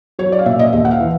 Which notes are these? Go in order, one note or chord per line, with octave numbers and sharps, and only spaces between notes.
F#3 C#5
D5
F5
A#2 E5
D#5
D#2 E5
F#5
F5
E3